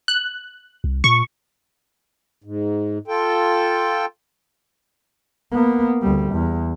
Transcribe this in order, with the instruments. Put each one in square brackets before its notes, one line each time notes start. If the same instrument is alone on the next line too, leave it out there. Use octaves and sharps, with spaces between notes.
[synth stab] F#6
[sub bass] C2
[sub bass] A#2 [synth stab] C#6
[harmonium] G#2
F4 A4 G5
[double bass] A#3 B3
D2 G3
E2